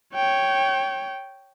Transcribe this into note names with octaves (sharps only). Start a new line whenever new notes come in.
C#5 G5